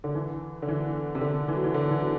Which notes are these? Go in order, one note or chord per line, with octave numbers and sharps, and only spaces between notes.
D3
E3
D3
E3
C3
D3
E3
F#3
E3
D3
E3
F#3